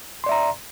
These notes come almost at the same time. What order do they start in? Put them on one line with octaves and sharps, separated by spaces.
C6 D5 E5 A#5